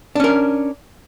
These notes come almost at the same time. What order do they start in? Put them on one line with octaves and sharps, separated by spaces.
D4 C#4 A#4